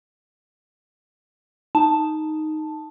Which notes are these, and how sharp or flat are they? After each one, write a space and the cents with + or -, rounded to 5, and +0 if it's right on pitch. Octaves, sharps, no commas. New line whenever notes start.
D#4 +0 A5 +0